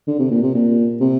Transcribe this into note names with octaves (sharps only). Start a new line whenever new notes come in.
D3
C3
A#2
C3
A#2
C3